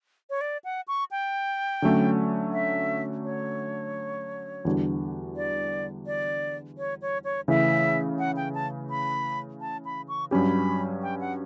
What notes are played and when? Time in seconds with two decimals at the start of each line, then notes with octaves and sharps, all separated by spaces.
0.30 C#5
0.41 D5
0.64 F#5
0.88 C#6
1.11 G5
1.82 D3 F#3 A3 C#4
2.53 E5
3.24 C#5
4.65 E2 D3 G3 D4 F#4
5.36 D5
6.06 D5
6.78 C#5
7.02 C#5
7.24 C#5
7.48 C#3 E3 A3 C#4 E4 E5
8.19 F#5
8.37 G5
8.54 A5
8.90 B5
9.61 A5
9.85 B5
10.09 C#6
10.31 G2 F#3 C#4 G4 B5
11.03 G5
11.20 F#5